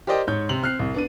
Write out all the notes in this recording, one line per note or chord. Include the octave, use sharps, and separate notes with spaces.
G4 A#4 C5 D5 D#5 G5
G#2 C#5 G6
C3 C4 F7 F#7
C4 F6 F#6 C7
C2
B3 D4 D#7